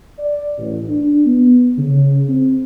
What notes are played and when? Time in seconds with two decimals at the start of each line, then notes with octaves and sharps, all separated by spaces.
0.18 D5
0.58 A1
0.87 D4
1.26 B3
1.79 C#3
2.29 C4